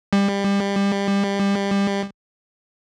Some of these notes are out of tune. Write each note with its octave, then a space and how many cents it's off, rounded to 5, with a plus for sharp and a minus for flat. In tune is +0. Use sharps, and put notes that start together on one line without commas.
G3 +25